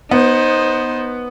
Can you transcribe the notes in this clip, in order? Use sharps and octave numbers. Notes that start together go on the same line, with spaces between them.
B3 D#4 C5